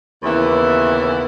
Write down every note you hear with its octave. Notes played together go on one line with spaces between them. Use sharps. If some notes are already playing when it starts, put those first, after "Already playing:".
D#2 C#3 E3 B3 E4